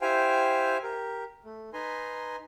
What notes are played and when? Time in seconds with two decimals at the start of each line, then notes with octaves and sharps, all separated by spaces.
0.01 E4 G4 C5 F5 G5 G#5
0.83 G4 A#4
1.45 A3
1.73 D#4 B4 G#5 A#5 C6